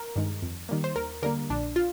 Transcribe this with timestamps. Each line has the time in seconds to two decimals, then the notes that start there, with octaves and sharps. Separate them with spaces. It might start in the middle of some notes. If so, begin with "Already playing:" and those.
Already playing: A#4
0.16 G2 D#3 G#3
0.42 F2
0.69 D#3 G3 A#3
0.84 C5
0.96 D#2 A#4
1.22 D3 G3 A#3 A#4
1.50 A#1 D4
1.76 F4